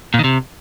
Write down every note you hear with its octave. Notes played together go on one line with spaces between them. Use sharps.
A#2
D#3
C3